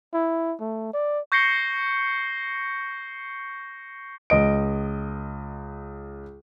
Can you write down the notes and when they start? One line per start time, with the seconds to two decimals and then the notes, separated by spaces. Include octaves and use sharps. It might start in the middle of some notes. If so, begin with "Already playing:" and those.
0.13 E4
0.61 A3
0.94 D5
1.32 C#6 G6 A#6 C7 C#7 G7
4.30 C#2 D#5 D7